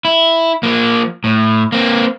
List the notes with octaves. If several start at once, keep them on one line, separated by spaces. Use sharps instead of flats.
E4
F3 A#3
A2
A#3 C4